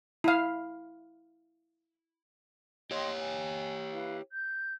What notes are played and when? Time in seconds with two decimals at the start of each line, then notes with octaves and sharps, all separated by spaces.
0.24 E4 F5
2.91 G4 C#5 D#5 G5 C6
3.19 G#5
3.92 E4 B4 F5
4.32 G6